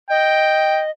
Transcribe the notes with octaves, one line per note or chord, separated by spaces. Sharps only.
D#5 G5